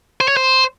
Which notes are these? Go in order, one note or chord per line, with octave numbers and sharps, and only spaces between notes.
C5
C#5
C5